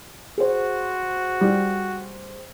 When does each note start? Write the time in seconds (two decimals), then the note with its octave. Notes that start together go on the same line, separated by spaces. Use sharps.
0.38 F#4 G#4 C5
1.41 G3